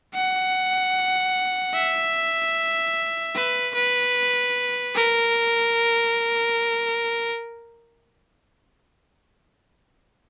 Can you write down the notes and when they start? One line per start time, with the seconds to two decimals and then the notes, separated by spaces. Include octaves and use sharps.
0.15 F#5
1.74 E5
3.35 B4
3.75 B4
4.95 A#4